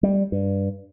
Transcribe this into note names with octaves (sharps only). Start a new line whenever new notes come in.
G3
G2